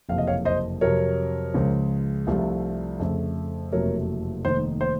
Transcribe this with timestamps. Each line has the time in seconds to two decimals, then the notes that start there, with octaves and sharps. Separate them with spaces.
0.09 F#1 F2 C3 F5
0.18 D#5
0.27 C#5 F5
0.45 C5 D#5
0.81 F2 C3 F#3 A#4 C#5
1.54 C#2 C#3 F3
2.27 C2 C3 F3 A3
3.00 F2 C#3 A3
3.72 F#1 F2 C3 F#3 A3 A#4 C#5
4.45 F1 D#2 D#3 C5
4.81 C5